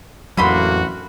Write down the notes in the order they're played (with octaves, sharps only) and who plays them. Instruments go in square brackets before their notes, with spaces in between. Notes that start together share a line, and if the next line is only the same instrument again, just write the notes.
[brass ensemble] A1 A#3 F#4 [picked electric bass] F2 F#3 [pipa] D3 B5 C6